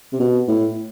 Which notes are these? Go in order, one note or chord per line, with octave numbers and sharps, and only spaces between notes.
C3
B2
A2